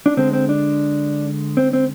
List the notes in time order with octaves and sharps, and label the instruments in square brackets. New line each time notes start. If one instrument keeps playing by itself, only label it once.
[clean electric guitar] D4
D3 G#3 C4
C4
D4
C4
C4